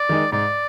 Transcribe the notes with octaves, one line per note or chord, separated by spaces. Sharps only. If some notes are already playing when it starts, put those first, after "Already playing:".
Already playing: D5
D#3 G#3 D#4
G#2 D5